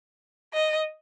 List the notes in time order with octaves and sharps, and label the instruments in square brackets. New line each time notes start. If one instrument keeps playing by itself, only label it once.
[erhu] D#5